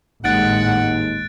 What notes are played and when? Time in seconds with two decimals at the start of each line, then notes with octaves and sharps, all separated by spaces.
0.24 G#1 D#2 A2 G#3 F#5 F#6 A6 D7